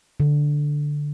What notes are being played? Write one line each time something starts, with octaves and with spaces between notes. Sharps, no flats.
D3